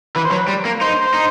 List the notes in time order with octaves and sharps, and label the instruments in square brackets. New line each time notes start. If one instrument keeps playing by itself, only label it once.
[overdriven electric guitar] E3 [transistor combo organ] B4
[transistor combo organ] C5
[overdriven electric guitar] F#3 [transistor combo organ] B4
[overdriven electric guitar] G3
A#3
[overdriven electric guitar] D#4 [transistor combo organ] C5
[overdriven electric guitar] D#4